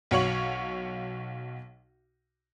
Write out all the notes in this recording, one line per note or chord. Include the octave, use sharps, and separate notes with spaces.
B1 F#4 C#5 F5 C#6 F#7